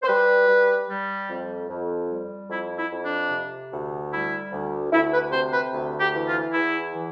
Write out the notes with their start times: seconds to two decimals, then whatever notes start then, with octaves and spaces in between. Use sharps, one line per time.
0.02 C5
0.08 G3 B4
0.48 G3
0.88 G3
1.29 F2
1.69 F2
2.09 G3
2.50 F2 E4
2.77 E4
2.90 F2
3.03 D4
3.30 C3
3.71 D2
4.11 G3 E4
4.52 D2
4.92 D2 E4
5.12 B4
5.32 C3 C5
5.52 B4
5.73 D2
5.99 G4
6.13 E3
6.26 F4
6.53 E2 E4
6.94 E3